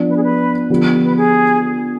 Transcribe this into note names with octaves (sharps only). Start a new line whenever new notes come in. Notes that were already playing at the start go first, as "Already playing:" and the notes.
Already playing: F3 B3 D4
B4
G#4
B4
D3 F3 B3 D4 G4
B4
G#4